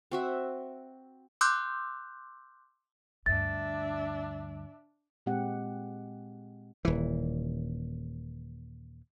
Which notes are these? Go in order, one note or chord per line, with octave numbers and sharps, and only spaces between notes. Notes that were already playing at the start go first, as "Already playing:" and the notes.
C4 F#4 E5
C6 D6 E6 F#6 G6
D2 G2 D4 E5 A6
A#2 G#3 C4 G4 F#5
D#1 E3